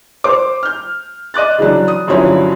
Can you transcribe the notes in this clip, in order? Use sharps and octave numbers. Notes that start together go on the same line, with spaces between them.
C5 D6
F6 G6
D#5 D6 F#6 A6
C#3 E3 F#3 D4
D#6
G2 D3 F3 F#3 C#4 E4